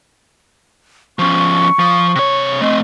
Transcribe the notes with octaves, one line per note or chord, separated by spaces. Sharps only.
F3 C#4 C#6
F3
C3 C#5
A3 C4 D#5